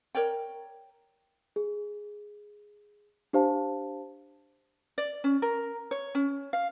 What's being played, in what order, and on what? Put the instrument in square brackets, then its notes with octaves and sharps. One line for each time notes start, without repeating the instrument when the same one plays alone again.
[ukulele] A#4 C#5 D5 G5
[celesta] G#4
D4 G4 C5 F5 A5
[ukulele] D5
C#4
A#4
C#5
C#4
F5